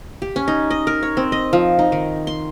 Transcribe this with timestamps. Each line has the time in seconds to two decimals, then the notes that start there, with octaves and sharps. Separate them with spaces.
0.22 G4
0.36 C#4
0.48 D#4
0.70 D#5
0.87 A#4
1.03 C#5
1.17 C4
1.32 D#5
1.53 F3
1.79 D#4
1.92 D#3
2.27 C6